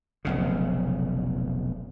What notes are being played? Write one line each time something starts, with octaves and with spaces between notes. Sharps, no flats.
F1 B1 C#3